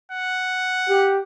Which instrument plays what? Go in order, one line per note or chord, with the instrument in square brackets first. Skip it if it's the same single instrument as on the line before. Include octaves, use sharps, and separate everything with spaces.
[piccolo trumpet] F#5
[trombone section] G4